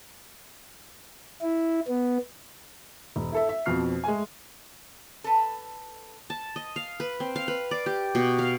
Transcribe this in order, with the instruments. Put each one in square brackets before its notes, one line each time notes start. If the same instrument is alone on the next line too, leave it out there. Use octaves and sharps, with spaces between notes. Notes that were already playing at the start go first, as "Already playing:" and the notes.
[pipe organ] E4
B3
[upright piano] E1
E4 A4 E5
E5
F2 B2 F3 F6 C7
G#3 A3 G#5
[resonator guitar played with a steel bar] A4 B4
[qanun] A5
D#5
F5
B4
C4
F5
B4
D5
G4
B2
F5